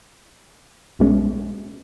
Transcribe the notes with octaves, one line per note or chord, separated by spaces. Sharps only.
B1 B2 G#3 C#4